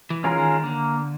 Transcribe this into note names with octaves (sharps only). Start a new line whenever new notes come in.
E3
G#3 C#4 F4 A#4
D#3
D3 A#3